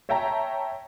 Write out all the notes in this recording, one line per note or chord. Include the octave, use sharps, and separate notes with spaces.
C#5 E5 G5 A5 A#5